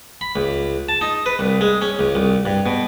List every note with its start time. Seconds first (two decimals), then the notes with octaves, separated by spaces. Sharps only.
0.21 B5
0.36 C#2
0.89 A5
1.01 D#4
1.26 B4
1.39 C2
1.61 G#3
1.82 C#4
1.99 C#2
2.15 C2
2.45 G2
2.66 B2